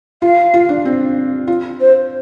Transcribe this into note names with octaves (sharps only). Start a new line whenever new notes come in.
F4 F5
F4
D4
C4
F4
C5